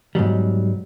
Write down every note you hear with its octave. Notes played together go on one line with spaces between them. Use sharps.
G#2 B2 F#3 G3